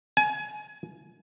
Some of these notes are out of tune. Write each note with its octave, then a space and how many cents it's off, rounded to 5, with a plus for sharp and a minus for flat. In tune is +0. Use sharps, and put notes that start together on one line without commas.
G#5 +25